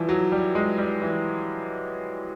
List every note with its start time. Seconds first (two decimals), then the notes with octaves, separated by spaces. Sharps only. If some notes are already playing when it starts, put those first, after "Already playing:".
Already playing: E3 F3 G3
0.09 F#3
0.32 G3
0.55 G#3
0.78 G3
1.02 E3